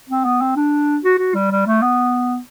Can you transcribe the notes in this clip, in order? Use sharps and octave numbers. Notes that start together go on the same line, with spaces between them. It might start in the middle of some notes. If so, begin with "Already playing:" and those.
C4
B3
C4
D4
F#4
F#4
G3
G3
A3
B3